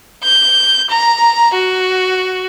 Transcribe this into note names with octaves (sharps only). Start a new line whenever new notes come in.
G6
A#5
F#4